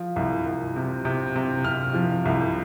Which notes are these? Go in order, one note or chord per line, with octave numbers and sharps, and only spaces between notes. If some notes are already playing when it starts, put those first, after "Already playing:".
Already playing: F3
C2
C2
C3
C3
C3
C3 F6
F3
C2